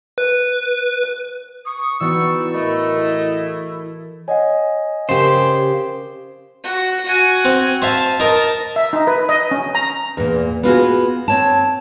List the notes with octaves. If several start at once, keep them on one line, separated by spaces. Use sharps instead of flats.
B4
C#6 D#6
E3 B3 D#4 F#4 D5 G5 C#6 E6
A2 A3 A#4 D#5 B5
E4 A4
C#5 D#5 F#5 G#5
C#3 G4 A#4 C5 E7
F#4
F#4 G#5
C4
C5 E5 F5 A5
D#4 A#4 A5
E5
D#4
B4
D#5
C#4
A#5
E2 A#2
B3 F4 F#4 G#4
C4 C#5 A5